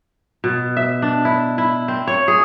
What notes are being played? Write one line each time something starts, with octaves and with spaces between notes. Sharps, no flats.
B2
E5
D4
E4
E4
C4
C#5
G#4